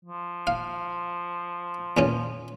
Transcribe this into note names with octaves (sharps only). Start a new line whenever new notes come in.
F3
F5
E2 A#2 C#4